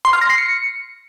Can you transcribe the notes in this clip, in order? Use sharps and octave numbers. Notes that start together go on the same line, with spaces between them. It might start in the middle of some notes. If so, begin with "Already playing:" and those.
C6
F6
A#6
C7
C#7